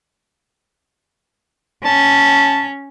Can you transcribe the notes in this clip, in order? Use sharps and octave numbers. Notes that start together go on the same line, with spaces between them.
C#4 A5